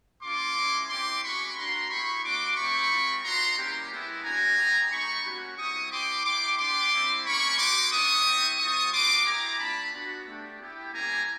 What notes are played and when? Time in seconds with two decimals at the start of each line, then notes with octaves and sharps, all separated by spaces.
0.22 A#3 C#4 F4 C6 D6
0.55 G#3 C#4 E4
0.89 C4 E4 G4 C6 D6
1.23 G#3 C#4 F#4 B5 C#6
1.55 A#3 D4 F#4 A#5 C6
1.89 B3 E4 G4 B5 C#6
2.23 A3 D4 F#4 C6 D6
2.56 A3 C4 E4 G4 B5 C#6
2.90 G#3 C4 F4
3.23 B3 D#4 F#4 A#5 C6
3.56 G3 A#3 C#4 E4 G4
3.90 G#3 B3 E4 G4
4.23 A#3 D4 F#4 G#5 A#5
4.57 B3 D#4 G4
4.90 G#3 B3 D#4 G4 B5 C#6
5.24 G3 A#3 C#4 F#4
5.57 G3 C4 E4 G4 C#6 D#6
5.90 C4 E4 G4 C6 D6
6.24 B3 E4 G4 C6 D6
6.57 B3 D4 G4 C6 D6
6.91 G3 C4 E4
7.24 G3 A#3 C#4 B5 C#6
7.57 A#3 D#4 F#4 C6 D6
7.91 G3 B3 D4 C#6 D#6
8.25 G3 C4 E4 G4
8.58 G3 C4 F4 C#6 D#6
8.91 A#3 D4 F#4 C6 D6
9.25 B3 E4 G4 G#5 A#5
9.59 A3 D4 F4 A5 B5
9.92 B3 D4 F#4
10.25 A3 D4 G4
10.60 B3 E4 G4
10.92 G3 A#3 C#4 E4 G4 G#5 A#5